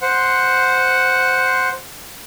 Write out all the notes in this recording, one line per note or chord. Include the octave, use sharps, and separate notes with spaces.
C5 F#5